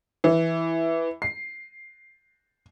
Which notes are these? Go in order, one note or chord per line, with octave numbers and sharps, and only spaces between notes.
E3
C7